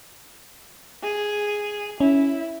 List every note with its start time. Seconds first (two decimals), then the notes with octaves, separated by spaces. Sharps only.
1.03 G#4
2.00 C#4 E4